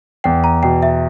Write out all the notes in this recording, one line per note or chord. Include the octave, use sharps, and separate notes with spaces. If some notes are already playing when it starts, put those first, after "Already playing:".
E2 G5
A#5
B2 G5
E5